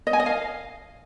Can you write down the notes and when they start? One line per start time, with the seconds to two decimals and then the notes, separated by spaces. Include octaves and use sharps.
0.07 D#5
0.13 G#5
0.20 D#5
0.26 F5